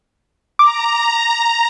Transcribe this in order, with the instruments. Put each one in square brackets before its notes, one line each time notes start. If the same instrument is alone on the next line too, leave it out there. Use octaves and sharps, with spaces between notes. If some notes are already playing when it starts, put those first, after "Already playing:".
[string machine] A#5 [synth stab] D6